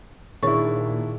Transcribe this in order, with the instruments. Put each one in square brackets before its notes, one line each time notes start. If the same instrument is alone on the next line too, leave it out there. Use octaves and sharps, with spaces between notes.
[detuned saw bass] A#2 [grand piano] D#3 D4 E4 [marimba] G#4 D5 [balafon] C#5 C#6